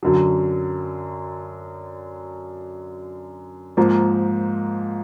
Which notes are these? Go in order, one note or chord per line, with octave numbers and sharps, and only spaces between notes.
F#2 D3 F#3
G#2 F3 A#3